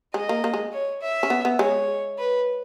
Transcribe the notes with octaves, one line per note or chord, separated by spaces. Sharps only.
G#3 D#5
A#3
A#3
G#3
C#5
E5
C#4
B3
B3
G#3 C#5
B4